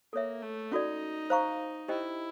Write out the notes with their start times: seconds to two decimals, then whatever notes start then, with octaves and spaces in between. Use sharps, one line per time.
0.13 A#3 A4 C#5 E5
0.42 A3
0.72 C#4 D#4 F#4 A4 D5
1.30 C5 F5 A#5 C#6
1.88 E4 G4 C5 D#5 G5